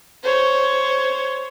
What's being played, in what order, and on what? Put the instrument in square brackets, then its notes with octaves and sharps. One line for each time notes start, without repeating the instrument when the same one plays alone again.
[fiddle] C5 C#5